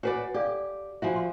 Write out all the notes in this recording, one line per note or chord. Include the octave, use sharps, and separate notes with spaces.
F#4 B4 C#5 D5 F#5 G#5
G4 A4 D5 F5
F3 E4 F#4 E5 F5 G#5
F5 C6